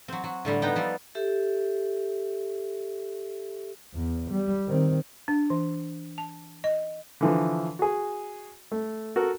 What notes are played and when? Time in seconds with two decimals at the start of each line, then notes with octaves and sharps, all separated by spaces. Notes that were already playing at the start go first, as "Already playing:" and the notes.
0.08 F#3 C4
0.24 F#3
0.45 A2 D3 G3
0.62 B3 D#4 B4 G5 A#5
0.75 F3 G3 A4
1.15 G4 A4 E5
3.94 E2
4.31 G3
4.68 D#3 C4
5.28 D4
5.50 E3
6.18 A5
6.64 D#5
7.21 D3 E3 F3
7.79 F#4 G#4
8.72 A3
9.16 F#4 A4 A#4